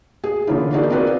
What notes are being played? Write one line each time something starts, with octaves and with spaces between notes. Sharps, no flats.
G#4
D3 E3 A#3 C#4 E4 F4
D4 D#4 F#4 G#4 A#4 D5
C4 F4 F#4 A#4 B4 D5